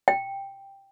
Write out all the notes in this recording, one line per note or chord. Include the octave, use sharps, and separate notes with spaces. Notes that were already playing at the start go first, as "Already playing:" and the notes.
G5